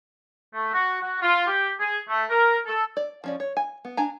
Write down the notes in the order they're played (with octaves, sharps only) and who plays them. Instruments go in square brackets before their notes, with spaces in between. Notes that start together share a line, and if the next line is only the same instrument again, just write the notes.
[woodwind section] A3
F#4
F#4
F4
G4
G#4
A3
A#4
A4
[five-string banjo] D5
F3 C#4 D5
C#5
G#5
B3
D4 G#5 A#5